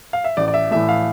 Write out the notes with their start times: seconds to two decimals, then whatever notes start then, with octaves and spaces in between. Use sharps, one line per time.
0.13 F5
0.24 E5
0.37 A1 D5
0.48 D5
0.54 E5
0.71 A2 E3 A3 E5
0.89 F5